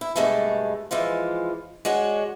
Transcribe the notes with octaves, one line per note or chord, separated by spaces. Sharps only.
E4
G2 B2 G#3 A3 A4
E3 F3 G#3 F4
G#3 D4 F#4 C#5